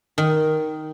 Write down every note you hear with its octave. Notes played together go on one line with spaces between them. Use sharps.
D#3